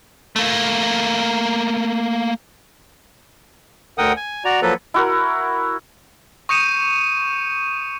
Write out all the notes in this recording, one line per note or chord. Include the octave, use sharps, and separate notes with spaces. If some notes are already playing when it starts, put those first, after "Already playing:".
A3 A#3
D2 D3 A#4 F#5 G5 D#6
G#5
F#4 D5 A#5
F3 F#3 A#3 A4 B4
E4 F#4 A#4
C#6 D#6 G6 C#7 D#7 E7